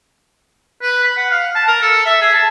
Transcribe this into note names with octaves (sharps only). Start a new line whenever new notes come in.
B4
B5
F#5
F5
A5
A#4
A4
E5
G#4
A5